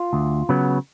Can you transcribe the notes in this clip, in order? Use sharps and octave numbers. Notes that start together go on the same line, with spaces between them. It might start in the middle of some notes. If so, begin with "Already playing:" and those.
Already playing: F4
D2
C#3 F#3 B3